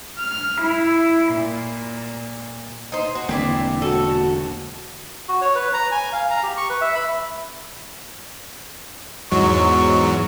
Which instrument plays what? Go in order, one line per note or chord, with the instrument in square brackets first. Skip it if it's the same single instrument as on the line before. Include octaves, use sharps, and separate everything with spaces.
[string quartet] F6
E4
A#2
[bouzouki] D#4 C5
F#4
[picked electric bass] E1 D3 A#3 [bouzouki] C4 E4 D5
[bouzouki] F#4 A4
[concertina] F#4
C#5
B4
A#5
G#5
F5
A#5
G4
C#6
B4
E5
B5
[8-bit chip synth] E2 G#2 F#3 [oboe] C#6